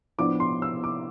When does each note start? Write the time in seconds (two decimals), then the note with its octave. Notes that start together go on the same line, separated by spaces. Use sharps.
0.18 A2 F3 B3 D4 D6
0.40 C6
0.62 E6
0.84 D6